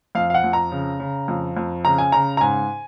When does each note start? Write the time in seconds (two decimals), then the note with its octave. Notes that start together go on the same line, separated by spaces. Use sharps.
0.15 F2 F5
0.30 F5
0.34 F#5
0.44 F2
0.53 A#5
0.72 C#3
1.00 C#3
1.28 F2
1.57 F2
1.85 C#3 A#5
1.98 G#5
2.12 C#3 A#5
2.37 A#5
2.41 G#2 G#5